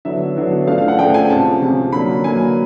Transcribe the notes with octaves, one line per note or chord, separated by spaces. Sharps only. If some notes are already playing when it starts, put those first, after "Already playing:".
D3 F#3 B3 E4 E5
D3 F#3 B3 E4
C#3 F3 A3 D4 F5
F5
F#5
C#3 F3 A3 D4 G5
G#5
C#2 C3 F3 A5
C#2 C3 F3
D3 F#3 A#3 B5
D3 F#3 A#3 G#5